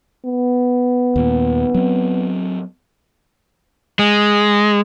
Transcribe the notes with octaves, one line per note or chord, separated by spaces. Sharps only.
B3
D#2 A#2
F#3 C4
G#3